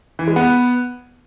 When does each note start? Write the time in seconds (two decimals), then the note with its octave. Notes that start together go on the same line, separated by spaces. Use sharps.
0.19 E3
0.28 G#3
0.36 B3